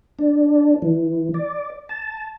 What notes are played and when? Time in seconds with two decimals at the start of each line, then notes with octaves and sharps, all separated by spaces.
0.19 D4
0.82 E3
1.34 D5
1.89 A5